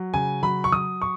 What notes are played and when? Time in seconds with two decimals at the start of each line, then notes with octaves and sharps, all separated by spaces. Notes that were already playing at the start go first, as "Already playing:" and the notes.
Already playing: F#3
0.14 C#3 G#5
0.43 F#3 B5
0.64 C#6
0.72 F#3 D#6
1.02 C#6